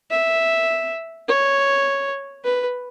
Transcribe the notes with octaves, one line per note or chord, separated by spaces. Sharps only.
E5
C#5
B4